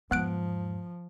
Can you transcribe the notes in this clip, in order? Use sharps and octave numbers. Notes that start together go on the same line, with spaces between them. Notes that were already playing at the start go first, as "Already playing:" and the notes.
E2 G#2 F3 B3 F#6 D7